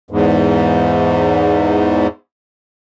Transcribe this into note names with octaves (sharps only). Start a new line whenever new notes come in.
E2 G#2